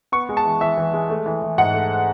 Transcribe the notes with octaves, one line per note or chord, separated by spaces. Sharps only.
B3 C#6
G#3
A5
E3
E3 E5
E3
G#3
A3
E3
E3
G#2 F#5
A3